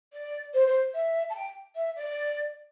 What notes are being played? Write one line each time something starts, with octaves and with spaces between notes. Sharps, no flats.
D5
C5
C5
E5
A5
G5
E5
D5